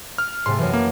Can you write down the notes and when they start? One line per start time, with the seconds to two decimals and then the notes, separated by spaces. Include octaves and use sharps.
0.18 F6
0.46 G#2 C3 A3 C6
0.58 F#2 E3
0.74 A#3